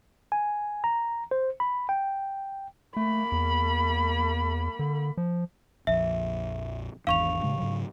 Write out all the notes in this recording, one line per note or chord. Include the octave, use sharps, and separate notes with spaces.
G#5
A#5
C5
B5
G5
A3 A#3 B5
E2
D3
F3
A#1 F2 E5
G#1 E2 D4 F5 C#6 F7
A2 C#3 G#3
G#2 C#3 F#3